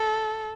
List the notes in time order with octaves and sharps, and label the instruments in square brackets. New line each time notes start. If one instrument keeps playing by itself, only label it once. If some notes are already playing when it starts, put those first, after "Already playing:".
Already playing: [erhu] A4